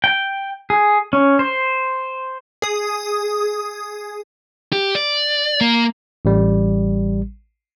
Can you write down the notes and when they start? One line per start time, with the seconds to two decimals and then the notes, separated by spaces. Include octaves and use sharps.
0.04 G5
0.70 G#4
1.13 C#4
1.39 C5
2.62 G#4 D#6
4.73 G4
4.95 D5
5.61 A#3
6.25 A1 G3